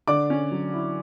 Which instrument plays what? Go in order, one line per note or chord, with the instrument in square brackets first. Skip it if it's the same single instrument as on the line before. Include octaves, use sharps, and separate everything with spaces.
[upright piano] D3 D5 D6
C#4
F#3
E4